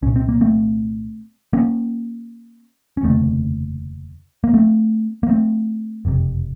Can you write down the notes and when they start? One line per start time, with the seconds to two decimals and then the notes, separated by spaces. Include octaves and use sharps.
0.02 C2 A#2 C#4
0.16 C4
0.29 A#3
0.41 A3 C4
1.53 A#3 C#4
2.97 C#4
3.03 F1 D#2 C#3 A3 C4
4.44 A#3
4.54 A3 C4
5.23 A#3
5.29 A3 C4
6.05 F#1 F2 C3